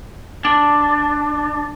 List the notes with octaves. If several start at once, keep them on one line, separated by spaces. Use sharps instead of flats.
D4